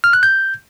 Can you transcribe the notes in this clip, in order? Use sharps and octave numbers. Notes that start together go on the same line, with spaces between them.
F6
F#6
G6